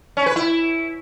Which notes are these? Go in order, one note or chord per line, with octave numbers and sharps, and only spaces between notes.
C#4
B4
E4